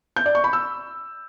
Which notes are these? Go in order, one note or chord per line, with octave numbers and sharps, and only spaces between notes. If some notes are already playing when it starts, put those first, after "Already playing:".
G6
D5
C#6
B5
E6